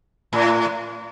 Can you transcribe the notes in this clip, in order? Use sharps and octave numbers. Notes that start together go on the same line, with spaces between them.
A2